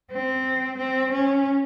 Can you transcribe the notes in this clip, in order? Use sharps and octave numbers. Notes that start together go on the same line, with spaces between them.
C4
C4
C#4